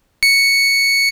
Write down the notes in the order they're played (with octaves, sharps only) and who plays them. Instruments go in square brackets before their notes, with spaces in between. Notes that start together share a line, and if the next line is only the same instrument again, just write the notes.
[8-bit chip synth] C#7